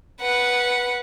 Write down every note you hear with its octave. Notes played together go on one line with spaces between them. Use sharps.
B4 F#5